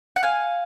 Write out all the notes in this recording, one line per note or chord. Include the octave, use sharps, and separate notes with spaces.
F#5
F5 G#5